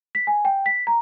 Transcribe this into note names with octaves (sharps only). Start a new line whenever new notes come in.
B6
G#5
G5
B6
A#5